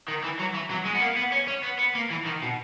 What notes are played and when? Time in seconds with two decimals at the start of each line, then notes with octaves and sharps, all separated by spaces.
0.08 D#3
0.24 E3
0.39 F#3
0.54 E3
0.70 F#3
0.85 G#3
0.95 B3
1.01 A#3
1.17 B3
1.32 C#4
1.48 C#4
1.63 B3
1.79 B3
1.95 A#3
2.10 E3
2.25 D#3
2.42 B2